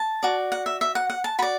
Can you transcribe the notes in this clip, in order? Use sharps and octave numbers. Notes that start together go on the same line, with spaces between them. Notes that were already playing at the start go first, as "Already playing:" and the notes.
Already playing: A5
F#4 D5
F#5
E5
E5
F#5
F#5
A5
F#4 D5 B5